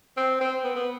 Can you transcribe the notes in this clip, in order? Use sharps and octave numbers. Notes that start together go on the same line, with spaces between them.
C4
C4
B3
B3